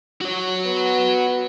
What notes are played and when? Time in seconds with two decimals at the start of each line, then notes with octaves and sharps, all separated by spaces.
0.21 F#4 C#5
0.65 B3